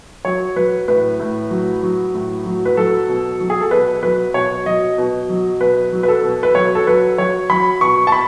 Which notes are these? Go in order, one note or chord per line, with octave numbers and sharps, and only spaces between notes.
F#3 C#5
F#3 B4
A2 B4
A2
F#3
F#3
A2
F#3
B4
F#3 A4
B2
F#3
G#4
A4
B2 B4
F#3 B4
B2 C#5
F#3 D#5
B2
F#3
B2 B4
F#3
B4
A4
B2
B4
F#3 C#5
A4
F#3 B4
F#3 C#5
F#3 B5
B2 C#6
A5
B5